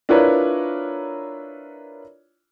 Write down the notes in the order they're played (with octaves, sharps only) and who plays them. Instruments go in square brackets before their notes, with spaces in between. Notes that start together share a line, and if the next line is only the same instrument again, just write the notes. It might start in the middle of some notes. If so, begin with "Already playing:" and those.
[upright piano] D4 E4 F4 A#4 B4 C#5